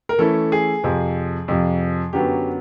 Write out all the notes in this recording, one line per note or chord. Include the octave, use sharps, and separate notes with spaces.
A#4
E3 A3 C#4 E4 A4
G#4
F2 C3 F3
F2 C3 F3
F#2 D3 F#3 B3 G4